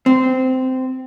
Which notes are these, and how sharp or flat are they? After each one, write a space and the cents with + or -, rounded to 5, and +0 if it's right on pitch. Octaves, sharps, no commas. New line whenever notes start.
C4 -15